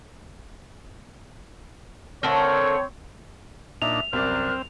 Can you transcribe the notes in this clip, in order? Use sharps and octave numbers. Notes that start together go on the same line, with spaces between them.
D3 A3 C4 A#4 C#5
A#2 D4 D#4 E5 F7
C2 F#2 C4 A#4 D5 F6 F#6